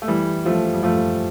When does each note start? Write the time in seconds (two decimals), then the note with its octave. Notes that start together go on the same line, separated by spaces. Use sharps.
0.02 A3
0.08 E3 G3
0.45 F3 A3
0.74 G3
0.83 F3 A3